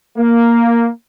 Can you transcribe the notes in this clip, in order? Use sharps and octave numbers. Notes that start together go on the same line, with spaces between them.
A#3